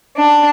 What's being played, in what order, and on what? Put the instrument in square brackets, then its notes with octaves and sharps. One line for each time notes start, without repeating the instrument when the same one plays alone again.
[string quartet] D4